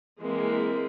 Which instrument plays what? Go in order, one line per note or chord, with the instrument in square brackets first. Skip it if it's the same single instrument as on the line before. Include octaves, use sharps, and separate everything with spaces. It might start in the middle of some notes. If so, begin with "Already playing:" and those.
[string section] E3 G#3 A#3 C4